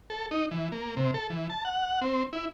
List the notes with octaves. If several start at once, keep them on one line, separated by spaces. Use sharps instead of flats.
A4
D#4
E3
A#3
C3
A4
E3
A5
F#5
C4
E4